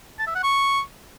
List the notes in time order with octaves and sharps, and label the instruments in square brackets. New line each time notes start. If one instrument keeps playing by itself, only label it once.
[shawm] A5
E5
F#5
C#6